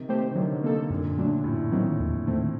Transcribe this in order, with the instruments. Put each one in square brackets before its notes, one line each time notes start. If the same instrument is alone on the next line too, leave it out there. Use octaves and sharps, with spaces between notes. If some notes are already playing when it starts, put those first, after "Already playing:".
Already playing: [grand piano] C3 D#3
[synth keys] A3 C4 G4 C5
[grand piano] D3
[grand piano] C3 D#3 [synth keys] F#3
[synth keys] A#3 D#4 A4
[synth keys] F#2 [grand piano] A#2 D3
[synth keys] F#3 A3 D4
[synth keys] F#2 [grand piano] A2
[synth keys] D#3 F#3 C4
D#2
D#3 A3 C4